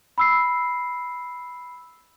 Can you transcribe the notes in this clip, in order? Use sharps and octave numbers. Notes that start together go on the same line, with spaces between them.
B5 E6 C7